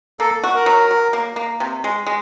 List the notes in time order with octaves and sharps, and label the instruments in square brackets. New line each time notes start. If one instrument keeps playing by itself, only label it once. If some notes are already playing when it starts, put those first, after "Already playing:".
[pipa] A#3 [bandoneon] A4
[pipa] F#4
[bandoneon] A#4
[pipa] F#3
F#3
A#3
A#3
C3
G#3
G#3